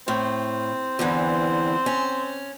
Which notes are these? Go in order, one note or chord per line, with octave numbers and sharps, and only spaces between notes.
A2 C4
E2 D3 E3
C#4